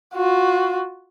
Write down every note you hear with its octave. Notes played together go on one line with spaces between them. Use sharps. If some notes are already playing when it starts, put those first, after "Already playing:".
F4 F#4